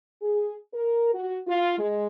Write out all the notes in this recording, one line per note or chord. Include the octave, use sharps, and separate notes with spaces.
G#4
A#4
F#4
F4
G#3